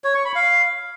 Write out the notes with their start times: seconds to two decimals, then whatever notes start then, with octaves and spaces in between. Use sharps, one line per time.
0.04 C#5
0.14 C#6
0.25 B5
0.35 F5